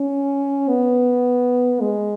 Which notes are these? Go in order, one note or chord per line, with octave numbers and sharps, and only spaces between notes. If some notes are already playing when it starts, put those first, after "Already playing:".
Already playing: C#4
B3
G#3